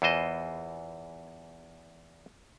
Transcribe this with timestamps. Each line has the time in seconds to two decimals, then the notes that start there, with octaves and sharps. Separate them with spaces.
0.02 E2 E3 F4 C5 D#5